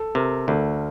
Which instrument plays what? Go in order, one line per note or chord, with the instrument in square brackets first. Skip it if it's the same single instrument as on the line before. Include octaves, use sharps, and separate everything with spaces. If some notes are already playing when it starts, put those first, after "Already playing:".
Already playing: [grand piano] A4
[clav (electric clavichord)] C3 [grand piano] A#4
[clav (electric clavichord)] D2 [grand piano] A4